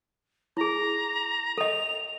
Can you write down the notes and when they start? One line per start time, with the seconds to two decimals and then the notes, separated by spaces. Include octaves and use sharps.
0.57 E4 G#4 A#5
1.58 A4 D#5 F7